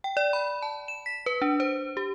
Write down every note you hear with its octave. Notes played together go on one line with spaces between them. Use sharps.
G5
D5
B5
A5
E7
B6
B4
D4
C5
G4